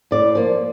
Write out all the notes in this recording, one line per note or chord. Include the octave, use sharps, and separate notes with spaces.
A2 D5
F3 A#3